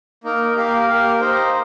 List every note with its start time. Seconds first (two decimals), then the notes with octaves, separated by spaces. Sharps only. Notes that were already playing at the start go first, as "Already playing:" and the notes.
0.24 A#3 D#4 A#4
0.55 A#3 G4 A#4 F5
0.88 A#3 G4 A#4 F5
1.20 D#4 C5 D#5